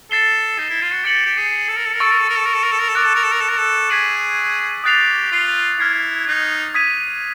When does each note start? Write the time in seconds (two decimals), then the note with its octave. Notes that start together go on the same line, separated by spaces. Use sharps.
0.10 A4 A6 C7 E7 G7
0.58 D#4
0.70 E4
0.82 F4
0.93 F#4
1.05 G4 A6 C#7 F#7
1.26 G4
1.37 G#4
1.68 A4
1.77 A#4
1.86 A4
1.95 A#4
2.00 A4 C#6 E6 A6 D7
2.12 A#4
2.20 A4
2.29 A#4
2.38 A4
2.46 A#4
2.54 A4
2.63 A#4
2.72 A4
2.81 A#4
2.89 A4
2.95 A#4 D6 F#6 A6
3.06 A4
3.15 A#4
3.24 A4
3.32 A#4
3.41 A4
3.49 A#4
3.58 A4
3.90 G#4 G#6 B6 D7 F#7
4.84 G4 D#6 F#6 A6 C7 F7
5.32 F4
5.79 E4 F6 G#6 C7
6.27 D#4
6.74 D#6 G#6 B6 D#7